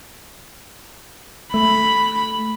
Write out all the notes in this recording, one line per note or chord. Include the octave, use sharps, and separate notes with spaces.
A3 B5